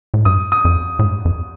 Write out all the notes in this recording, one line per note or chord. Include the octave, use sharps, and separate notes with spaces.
A2
G2 D#6
D#6
F2
A2
G2
F2